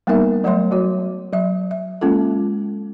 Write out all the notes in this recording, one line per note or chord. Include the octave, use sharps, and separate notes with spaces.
G3 A#3 B3 D#4 A#4 E5
F#3 A3 C#5 E5 C6
F#3 F#4 C#5
F#3 E5
E5
G#3 A#3 C#4 F4 A4